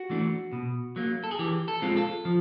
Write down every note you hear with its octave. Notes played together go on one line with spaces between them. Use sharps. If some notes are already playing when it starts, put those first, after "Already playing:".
Already playing: F#4
E3 A3 D4
B2
F#3 A#3
A4
G#4
E3 G4
A4
G#3 C4 F4
A4
F3